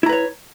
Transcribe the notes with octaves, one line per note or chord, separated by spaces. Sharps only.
E4 B4 C#5 A#5